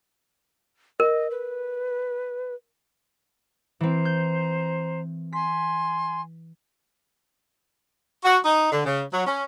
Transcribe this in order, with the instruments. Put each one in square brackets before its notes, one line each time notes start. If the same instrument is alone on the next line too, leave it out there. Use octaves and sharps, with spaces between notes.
[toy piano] A#4 [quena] D#5
[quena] B4
[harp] E3 C4 [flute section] C5 A#5
[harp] G6
[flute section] G#5 C6 [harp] B6
[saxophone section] F#4
D#4
D3
C#3
F#3
C#4